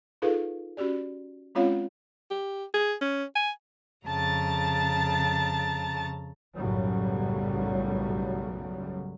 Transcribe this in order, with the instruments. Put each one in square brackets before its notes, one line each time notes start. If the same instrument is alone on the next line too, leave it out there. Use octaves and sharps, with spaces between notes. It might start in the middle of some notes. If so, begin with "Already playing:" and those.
[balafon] D#4 F4 G#4 A4 B4 F5
C#4 F#4 G4 D5
G#3 C4 C#4 F4 C#5 F5
[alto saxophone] G4
G#4
C#4
G#5
[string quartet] F2 C#3 A5 A#5 A6
[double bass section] B1 F#2 A2 C#3 F#3 G3